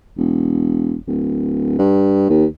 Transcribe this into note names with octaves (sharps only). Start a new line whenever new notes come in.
E1
D1
G2
D#2